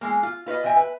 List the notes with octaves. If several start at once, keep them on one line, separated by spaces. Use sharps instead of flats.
E3 G#3 A#3
F4
F4 B4 C#5 D#5
E3 D#5 E5 G5 G#5
B4 E5